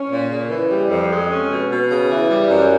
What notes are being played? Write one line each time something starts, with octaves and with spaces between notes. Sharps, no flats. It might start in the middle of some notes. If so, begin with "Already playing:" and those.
Already playing: C#4
A#2
C#3
E3
G3
F2
G#3
C#4
B2
B2
C#3
E3
G3
F#2